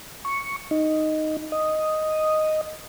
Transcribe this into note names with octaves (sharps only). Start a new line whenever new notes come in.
C#6
D#4
D#5